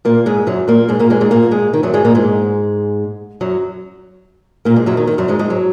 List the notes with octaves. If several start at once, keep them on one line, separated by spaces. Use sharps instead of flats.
A#2 A#3
G#2 G#3
F#2 F#3
A#2 A#3
G#2 G#3
A#2 A#3
G#2 G#3
G#2 G#3
A#2 A#3
G#2 G#3
D#3
F#2 F#3
G#2 G#3
A#2 A#3
G#2 G#3
F#2 F#3
A#2 A#3
G#2 G#3
F#2 F#3
D#3
D#3
F#2 F#3
G#2 G#3
G#2 G#3
F#3